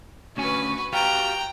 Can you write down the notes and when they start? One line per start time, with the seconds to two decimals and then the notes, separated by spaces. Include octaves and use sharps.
0.37 D2 C#4 F#4 B4 G#5
0.93 F#4 G4 F5 G5 A#5